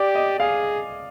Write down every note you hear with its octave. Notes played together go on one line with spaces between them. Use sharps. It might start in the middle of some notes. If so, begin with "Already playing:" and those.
Already playing: G4 D5
D#5
G#4 F5